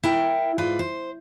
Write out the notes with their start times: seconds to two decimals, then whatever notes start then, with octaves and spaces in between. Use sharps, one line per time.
0.03 E4 A#4 G5
0.58 G#2 F4 B4 D5
0.79 C5